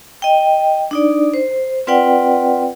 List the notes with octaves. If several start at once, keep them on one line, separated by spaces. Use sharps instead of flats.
D#5 G5
D4 D#4 D5
C5
C4 F4 B4 D5 F#5 G5